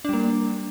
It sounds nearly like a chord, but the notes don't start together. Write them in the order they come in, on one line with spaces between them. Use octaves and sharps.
D4 G3 A#3